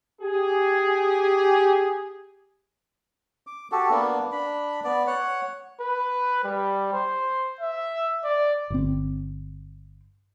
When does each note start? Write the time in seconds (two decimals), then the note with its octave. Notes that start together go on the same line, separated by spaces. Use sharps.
0.21 G4 G#4
3.47 D6
3.72 F#4 G4 A4
3.90 A#3 B3 D4
4.32 D4 B5
4.84 B3 D5
5.07 C#5 F#5
5.81 B4
6.44 G3
6.93 C5
7.61 E5
8.24 D5
8.70 G1 C4